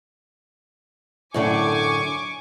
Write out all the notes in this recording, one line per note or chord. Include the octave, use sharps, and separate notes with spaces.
F#2 A2 D3 G#5 C#6 D6